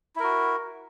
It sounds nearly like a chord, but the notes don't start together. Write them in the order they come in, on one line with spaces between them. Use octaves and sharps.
E4 A#4 F#4